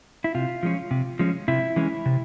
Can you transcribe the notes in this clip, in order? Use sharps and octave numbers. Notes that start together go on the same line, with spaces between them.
E4
C3 F4
F3 G#3 C#4
C3
F3 G#3 C#4
C3 E4
E3 G#3 C#4
C3